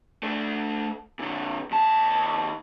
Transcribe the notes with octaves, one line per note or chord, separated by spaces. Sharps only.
A3 D4
A#2 D3
D#2 A5